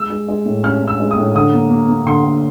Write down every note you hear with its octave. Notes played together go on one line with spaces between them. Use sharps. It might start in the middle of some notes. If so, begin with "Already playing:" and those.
Already playing: G#3 E6
G#3
G#3
A2
C#4 F6
C#4
E6
G#3
D#6
A2
D3 D#6
A#3
A#3
A#3
D3 C6
D3